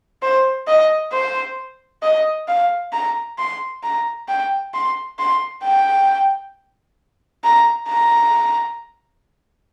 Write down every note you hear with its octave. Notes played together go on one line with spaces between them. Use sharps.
C5
D#5
C5
D#5
F5
A#5
C6
A#5
G5
C6
C6
G5
A#5
A#5